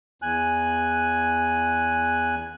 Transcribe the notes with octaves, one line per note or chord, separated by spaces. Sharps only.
E2 G#5 F#6